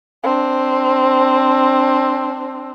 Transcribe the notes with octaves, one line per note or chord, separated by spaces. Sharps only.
C4 D4